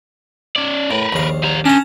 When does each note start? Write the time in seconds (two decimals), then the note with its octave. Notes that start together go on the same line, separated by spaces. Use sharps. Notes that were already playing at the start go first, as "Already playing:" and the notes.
0.56 C#4 D5
0.91 A2 A#4 B4
1.13 A#1 D#2 F5
1.43 G3 A#5
1.65 C#4 D4 G4 A5 A#5